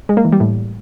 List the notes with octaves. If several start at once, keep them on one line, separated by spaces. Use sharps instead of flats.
G#3
A#3
E3
G3
A2